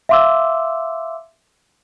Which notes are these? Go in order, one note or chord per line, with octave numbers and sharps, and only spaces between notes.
E5 F5 C6 D6 E6